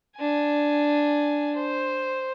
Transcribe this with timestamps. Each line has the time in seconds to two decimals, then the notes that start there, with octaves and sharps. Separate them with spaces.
0.18 D4 G#5
1.56 C5